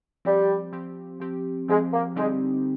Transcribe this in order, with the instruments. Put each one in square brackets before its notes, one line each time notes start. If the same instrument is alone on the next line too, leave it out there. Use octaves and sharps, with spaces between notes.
[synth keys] F3 C4 G4 [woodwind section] G3
[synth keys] F3 C4 G4
F3 C4 G4
[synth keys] F3 C4 G4 [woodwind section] G#3
[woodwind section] A#3
[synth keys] D3 G3 C4 D#4 G4 [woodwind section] G#3